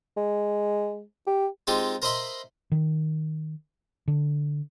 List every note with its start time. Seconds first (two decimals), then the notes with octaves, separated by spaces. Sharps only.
0.17 G#3
1.27 G4
1.67 G#3 C4 D#4 F4 G4
2.02 A#4 C5 D#5 E5 B5 C6
2.72 D#3
4.08 D3